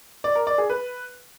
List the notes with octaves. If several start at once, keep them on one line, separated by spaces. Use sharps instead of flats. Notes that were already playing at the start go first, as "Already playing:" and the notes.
D5
A#4
D5
G#4
B4